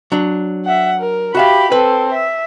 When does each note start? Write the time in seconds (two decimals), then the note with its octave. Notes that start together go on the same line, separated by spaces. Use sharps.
0.12 F#3 D4
0.65 E5 F#5
0.99 A#4
1.35 F#4 G4 E5 F5 B5
1.72 C4 A4 B4
2.13 E5